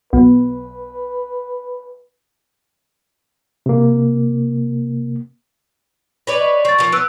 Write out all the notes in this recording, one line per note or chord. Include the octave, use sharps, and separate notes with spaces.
B1 B4
C3 A#3
B4 C#5 D5
D#5
C4 C#6 A6
D#3 F3
B3 E6 F#6 D7